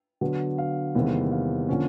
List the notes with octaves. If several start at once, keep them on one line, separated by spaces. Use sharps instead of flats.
D3 F#3 B3
F5
E2 C3 D#3 G3 A#3
F5
D3 F3 A#3 C#4